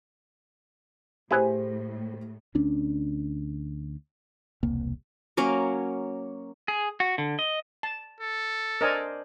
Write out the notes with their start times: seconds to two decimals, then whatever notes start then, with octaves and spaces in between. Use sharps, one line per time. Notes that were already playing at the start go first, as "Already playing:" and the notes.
1.31 A2 E4 G4 G#4 B4 C5
2.55 D2 C#4 D4
4.63 E1 C2 A#3
5.37 F#3 A#3 C#4
6.68 G#4
7.00 F#4
7.18 D3
7.39 D#5
7.83 A5
8.20 A4
8.81 D4 A#4 C5 D5 D#5 G#5